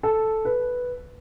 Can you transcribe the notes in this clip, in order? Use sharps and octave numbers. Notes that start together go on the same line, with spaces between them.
A4
B4